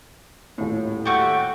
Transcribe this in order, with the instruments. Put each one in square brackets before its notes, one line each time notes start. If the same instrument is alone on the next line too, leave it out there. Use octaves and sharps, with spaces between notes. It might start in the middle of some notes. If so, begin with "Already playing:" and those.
[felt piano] D#1 A2
[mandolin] A3 F#4 G4